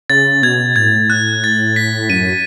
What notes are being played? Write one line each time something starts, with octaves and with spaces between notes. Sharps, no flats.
C#3 A6
B2 G#6
A2 G#6
F#6
A6
B6
F#2 D#7